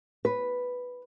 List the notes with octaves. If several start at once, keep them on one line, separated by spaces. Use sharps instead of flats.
B4